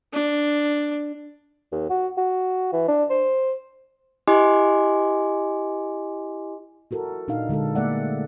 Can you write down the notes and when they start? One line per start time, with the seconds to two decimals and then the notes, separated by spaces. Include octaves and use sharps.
0.13 D4
1.72 D#2
1.90 F#4
2.17 F#4
2.73 E3
2.88 D4
3.10 C5
4.28 E4 G4 D#5 G#5 C6 D6
6.91 E4 F#4 A4 A#4
7.28 A#2 D4 D#4 F5
7.49 D3 G#3 D4 A4
7.75 A3 A#3 G#4 D5 E5 F#5